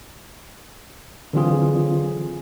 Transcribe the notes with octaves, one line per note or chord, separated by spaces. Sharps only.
D3 E3 F#3 C4 F4 G#4